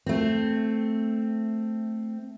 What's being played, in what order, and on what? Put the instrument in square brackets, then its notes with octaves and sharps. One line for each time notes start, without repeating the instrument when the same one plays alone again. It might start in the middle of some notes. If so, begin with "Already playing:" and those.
[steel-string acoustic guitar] A3 C4